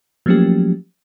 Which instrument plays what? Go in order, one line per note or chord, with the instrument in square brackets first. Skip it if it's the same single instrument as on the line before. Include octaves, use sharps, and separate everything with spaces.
[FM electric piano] F3 F#3 A3 A#3 C#4 G4